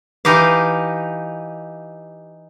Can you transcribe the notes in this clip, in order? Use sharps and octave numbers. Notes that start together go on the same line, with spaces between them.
E3 D#4 G4 F5